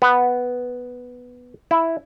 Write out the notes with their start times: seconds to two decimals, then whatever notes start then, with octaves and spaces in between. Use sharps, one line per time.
0.02 B3
1.71 E4